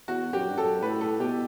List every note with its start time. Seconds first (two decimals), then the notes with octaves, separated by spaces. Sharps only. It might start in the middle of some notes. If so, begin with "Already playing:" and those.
0.08 E2 F#4
0.32 F#2 G4
0.50 G2
0.57 F#2 A4
0.83 A2 B4
1.01 A4
1.19 B2 G4